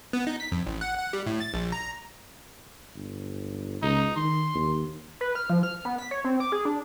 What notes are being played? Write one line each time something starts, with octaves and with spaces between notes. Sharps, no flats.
B3
D#4
B6
F2
A1
F#5
F#5
G3
A2
A6
A#1
A#5
G1
C#2 D#4
D#3 C6
D#2
B4
F6
F3
F6
B3
B6
C#5
C4
D6
G#4
D4